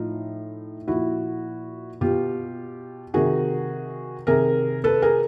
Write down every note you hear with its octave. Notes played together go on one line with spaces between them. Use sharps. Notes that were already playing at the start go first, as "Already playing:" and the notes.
Already playing: A2 F3 D#4 F4
A#2 F3 E4 F#4
B2 F4 G4
C3 D#3 F#4 G#4
C3 D#3 G#4 A#4
A4 B4
G#4 A#4